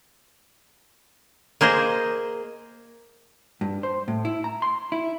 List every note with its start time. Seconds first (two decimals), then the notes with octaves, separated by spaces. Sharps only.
1.61 A#3 G#4 C5 D#5
3.61 G2
3.83 C5
4.08 A2
4.25 E4
4.44 A#5
4.62 C6
4.92 E4